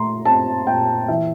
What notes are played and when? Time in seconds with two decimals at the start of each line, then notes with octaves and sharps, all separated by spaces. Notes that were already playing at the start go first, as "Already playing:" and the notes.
Already playing: A#2 A3 A#5 C6
0.25 C4 A5
0.67 A#2 G5
1.08 E3 E5